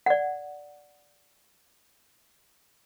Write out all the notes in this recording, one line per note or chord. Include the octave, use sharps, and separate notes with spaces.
D5 F#5